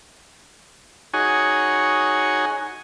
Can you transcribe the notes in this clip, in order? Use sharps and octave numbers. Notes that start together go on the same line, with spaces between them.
D#4 F#4 G#4 C#5 G#5